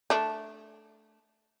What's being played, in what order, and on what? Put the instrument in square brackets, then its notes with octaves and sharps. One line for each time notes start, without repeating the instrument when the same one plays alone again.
[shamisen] A3 D4